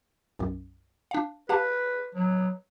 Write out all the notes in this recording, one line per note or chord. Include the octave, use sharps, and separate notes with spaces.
B1 F#2
D4 F5
G4 B4 F5 A5
F#3